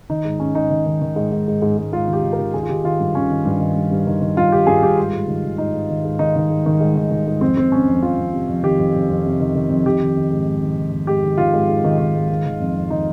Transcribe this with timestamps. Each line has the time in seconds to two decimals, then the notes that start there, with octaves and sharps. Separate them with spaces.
0.09 D#3 D#4
0.25 G#2
0.40 G#2 C#4
0.55 G#2 D#4
0.70 D#3
0.86 D#3
1.01 D#3
1.16 G#2
1.32 G#2
1.48 G#2
1.62 G#2
1.78 G#2
1.92 G#2 F4
2.07 D#3
2.13 G4
2.23 D#3
2.33 A#4
2.38 D#3
2.54 D#3 G#4
2.63 F4
2.69 D#3 G4
2.84 D#3 F4
3.00 G2
3.14 D#3 C#4
3.30 D#3
3.45 G2
3.60 D#3
3.76 G2
3.91 G2
4.07 D#3
4.21 D#3
4.37 G2 F4
4.52 D#3 G4
4.67 G2 G#4
4.82 G2 G4
4.98 G#2 F4
5.13 G#2
5.28 D#3
5.44 D#3
5.58 G#2 D#4
5.73 G#2
5.90 D#3
6.04 G#2
6.19 D#3 D#4
6.36 D#3
6.50 G#2
6.66 D#3
6.80 G#2
6.96 D#3
7.11 D#3
7.27 G#2
7.41 F2 C4
7.57 F2 C4
7.72 F2 C#4
7.87 F2
8.02 F2 F4
8.18 F2
8.33 C3
8.48 F2
8.63 D#3 G4
8.78 F2
8.95 F2
9.10 F2
9.25 C3
9.40 D#3
9.55 D#3
9.70 F2
9.86 D#3 G4
10.01 D#3
10.17 D#3
10.31 G#2
10.46 G#2
10.63 D#3
10.77 D#3
10.92 D#3
11.07 G#2 G4
11.24 D#3
11.38 D#3 F4
11.54 G#2
11.69 G#2
11.84 D#3
11.99 D#3
12.15 G#2
12.30 D#3
12.46 D#3
12.60 F2
12.76 F2
12.90 D#3 D#4